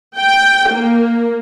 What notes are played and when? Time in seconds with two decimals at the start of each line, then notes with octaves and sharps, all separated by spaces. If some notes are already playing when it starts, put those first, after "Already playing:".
0.17 G5
0.72 A#3